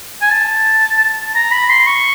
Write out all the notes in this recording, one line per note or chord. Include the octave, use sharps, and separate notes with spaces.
G#5
A5
A#5
B5
C6
C#6